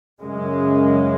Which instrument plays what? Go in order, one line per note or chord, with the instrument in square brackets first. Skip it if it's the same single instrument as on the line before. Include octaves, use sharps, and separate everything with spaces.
[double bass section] F#2 C#3 G#3